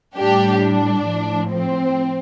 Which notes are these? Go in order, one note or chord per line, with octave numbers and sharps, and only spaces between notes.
A2 G3 D4 G4
D4
A2 F3
C4